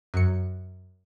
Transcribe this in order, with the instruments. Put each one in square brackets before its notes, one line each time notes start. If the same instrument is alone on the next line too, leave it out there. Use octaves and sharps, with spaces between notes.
[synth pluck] F#2 C#7